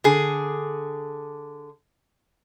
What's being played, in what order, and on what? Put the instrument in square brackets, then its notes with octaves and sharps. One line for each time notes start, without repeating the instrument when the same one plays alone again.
[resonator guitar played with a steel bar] D3 G#4